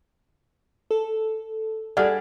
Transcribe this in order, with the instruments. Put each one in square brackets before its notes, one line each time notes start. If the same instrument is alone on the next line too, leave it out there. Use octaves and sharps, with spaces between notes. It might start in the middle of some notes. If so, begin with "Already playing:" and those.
[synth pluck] A4
[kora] G3 D4 G#4 [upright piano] A4 F6 [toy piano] D5 F#5